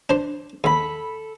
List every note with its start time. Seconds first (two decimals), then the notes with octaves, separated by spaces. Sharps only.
0.10 D4 C5
0.64 D#2 A4 B5